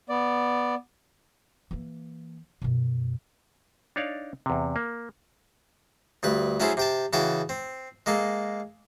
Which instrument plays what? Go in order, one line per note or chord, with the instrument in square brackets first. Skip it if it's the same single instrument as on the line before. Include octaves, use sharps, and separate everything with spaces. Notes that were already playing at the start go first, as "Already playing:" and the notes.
[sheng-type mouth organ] B3 D5
[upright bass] E3 A#3
F#2 B2
[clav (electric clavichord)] D4 D#4 C#5 D5 F5
E2 C3
A#3
[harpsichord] D2 G2 B4
F#3 C#4 E4 G#4 A4 C5
C3 G5 A5
C#3 E3 F#4 G5 A5
C4
G#3 A#3 A4